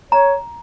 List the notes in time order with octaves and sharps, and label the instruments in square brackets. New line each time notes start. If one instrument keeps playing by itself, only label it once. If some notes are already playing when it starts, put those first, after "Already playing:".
[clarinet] C#5 [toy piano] A#5